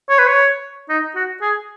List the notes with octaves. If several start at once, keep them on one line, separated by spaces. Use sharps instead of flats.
C#5
B4
C#5
D#4
F#4
G#4